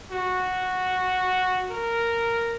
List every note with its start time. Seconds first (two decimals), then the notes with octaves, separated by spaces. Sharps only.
0.11 F#4
1.70 A#4